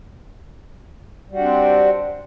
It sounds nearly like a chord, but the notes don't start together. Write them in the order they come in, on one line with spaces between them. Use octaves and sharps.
G3 F#4 D4 C4